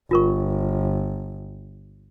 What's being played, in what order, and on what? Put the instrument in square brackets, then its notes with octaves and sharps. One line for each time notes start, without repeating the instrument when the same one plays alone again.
[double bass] G1 [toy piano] F4 A#4 C#6